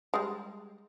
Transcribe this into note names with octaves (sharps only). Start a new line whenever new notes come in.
G3 G#3